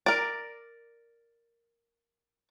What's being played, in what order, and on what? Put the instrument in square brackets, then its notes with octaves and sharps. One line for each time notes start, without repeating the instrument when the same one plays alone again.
[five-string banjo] A#4 D5